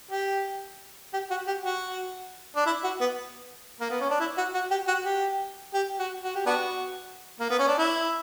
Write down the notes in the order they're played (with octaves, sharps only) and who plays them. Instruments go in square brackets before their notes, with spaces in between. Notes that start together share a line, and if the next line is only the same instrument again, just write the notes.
[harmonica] G4
G4
F#4
G4
F#4
D4
E4
F#4
B3
A#3
B3
C#4
D4
E4
F#4
F#4
G4
F#4
G4
G4
F#4
F#4
G4
B3 D4 F#4
A#3
B3
C#4
D4
E4